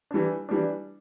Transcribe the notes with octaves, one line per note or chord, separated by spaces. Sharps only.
E3 G3 D4
E3 G3 D4